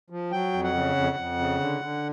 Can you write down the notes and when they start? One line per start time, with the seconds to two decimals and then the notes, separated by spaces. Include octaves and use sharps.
0.10 F3
0.31 F#3 G5
0.53 F2
0.64 F#5
0.74 C#3
0.96 F2
1.16 F2
1.39 C#3
1.60 D3
1.81 D3